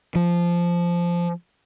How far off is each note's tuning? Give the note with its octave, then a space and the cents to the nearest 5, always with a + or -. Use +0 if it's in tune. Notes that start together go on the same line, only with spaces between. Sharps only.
F3 -10